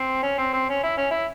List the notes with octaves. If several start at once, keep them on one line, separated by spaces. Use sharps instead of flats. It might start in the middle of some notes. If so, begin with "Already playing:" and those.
Already playing: C4
C#4
C4
C4
C#4
E4
C#4
E4